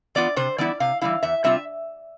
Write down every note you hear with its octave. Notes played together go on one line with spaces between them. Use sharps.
E3 B3 F4 D5
C3 C5
E3 G3 B3 E4 D5
C3 F5
E3 G3 B3 E4 F5
E2 E5
C3 G3 C4 F4 E5